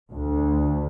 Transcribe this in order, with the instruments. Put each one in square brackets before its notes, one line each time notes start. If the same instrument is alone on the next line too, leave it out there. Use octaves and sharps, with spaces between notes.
[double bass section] D2